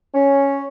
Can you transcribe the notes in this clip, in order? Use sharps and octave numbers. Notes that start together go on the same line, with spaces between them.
C#4